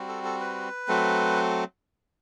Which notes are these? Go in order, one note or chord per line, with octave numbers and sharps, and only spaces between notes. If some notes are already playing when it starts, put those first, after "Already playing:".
Already playing: G3 C4 F#4
A4
A4
B4
F#3 A3 C4